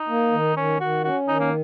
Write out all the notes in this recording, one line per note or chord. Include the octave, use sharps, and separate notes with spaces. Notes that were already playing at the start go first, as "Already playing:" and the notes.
Already playing: D#4
A#3
D#3
D#3 C#4
D#3 F#4
C#4 F#4
D#3 D#4
A#3